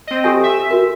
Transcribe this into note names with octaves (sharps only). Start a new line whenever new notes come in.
C4 D#5
G4 A4 G#5
E5
F#4 A#4